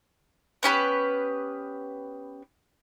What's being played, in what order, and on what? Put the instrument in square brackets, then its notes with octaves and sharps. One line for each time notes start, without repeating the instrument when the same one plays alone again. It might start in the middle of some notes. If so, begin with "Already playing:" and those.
[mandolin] B3 C#4 G4 B4